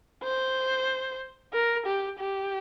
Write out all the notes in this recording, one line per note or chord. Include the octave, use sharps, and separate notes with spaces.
C5
A#4
G4
G4